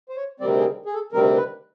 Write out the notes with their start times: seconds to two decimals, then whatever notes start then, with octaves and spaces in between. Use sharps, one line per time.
0.09 C5
0.16 C#5
0.40 D2 C3 D#3 G3 C4 D5
0.58 G#4
0.86 G#4
0.94 A4
1.12 D2 C3 D#3 G3 C4 A#4
1.36 B4